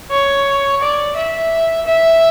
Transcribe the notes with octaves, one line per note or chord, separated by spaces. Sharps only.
C#5
D5
E5
E5